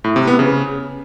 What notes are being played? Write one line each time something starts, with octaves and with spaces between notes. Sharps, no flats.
A2
C3
B3
C#3